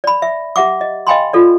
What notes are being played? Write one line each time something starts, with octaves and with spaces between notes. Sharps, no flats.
D5 B5
E5
G4 E5 F#5 D6
D#5
D#5 F5 G5 G#5 B5 C6
F4 A4 D5